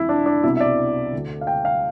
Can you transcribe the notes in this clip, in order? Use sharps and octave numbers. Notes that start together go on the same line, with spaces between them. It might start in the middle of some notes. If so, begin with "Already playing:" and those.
Already playing: F2 E3 E4
D4
D4
C2 B2 E4
E5
D5
D2 D3
F5
G5
F5